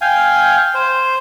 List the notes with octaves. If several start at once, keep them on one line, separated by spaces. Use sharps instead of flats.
F5 G5 G#5
C5